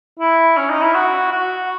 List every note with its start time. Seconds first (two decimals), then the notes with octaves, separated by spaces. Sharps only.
0.20 E4
0.57 C#4
0.70 D#4
0.82 E4
0.95 F#4
1.32 F#4